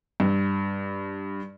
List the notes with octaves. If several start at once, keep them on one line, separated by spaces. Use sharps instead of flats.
G2